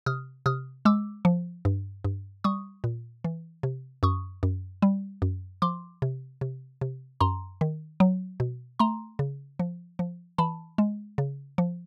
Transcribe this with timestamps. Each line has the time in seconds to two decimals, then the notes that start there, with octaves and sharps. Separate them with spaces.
0.06 C3 D#6 F6
0.46 C3 D#6 F6
0.85 G#3 D6 E6
1.25 F3
1.65 G2
2.05 G2
2.44 G3 C#6 D#6
2.84 A#2
3.24 E3
3.63 C3
4.03 F#2 C#6 D#6
4.43 F#2
4.82 G3
5.22 F#2
5.62 F3 C6 D6
6.02 C3
6.41 C3
6.81 C3
7.21 F#2 A#5 C6
7.61 D#3
8.00 F#3
8.40 B2
8.79 A3 A#5 C6
9.19 C#3
9.59 F3
9.99 F3
10.38 E3 A5 B5
10.78 G#3
11.18 C#3
11.58 F3